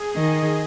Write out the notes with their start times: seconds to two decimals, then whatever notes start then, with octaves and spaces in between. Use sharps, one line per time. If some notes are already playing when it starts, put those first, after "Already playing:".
Already playing: G#4
0.16 D#3 D#5